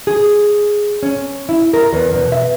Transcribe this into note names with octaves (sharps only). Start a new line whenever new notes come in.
G#4
C#4
E4
A#4
E2
B2
E5